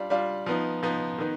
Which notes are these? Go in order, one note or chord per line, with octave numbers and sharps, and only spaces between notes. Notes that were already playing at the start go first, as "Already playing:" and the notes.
Already playing: G3 D4 F4
G3 D4 F4
F3 B3 D#4
F3 B3 D#4
D#3 B3 D#4